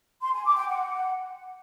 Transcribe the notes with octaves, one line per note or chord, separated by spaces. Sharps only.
C6
G#5
D6
G5
F#5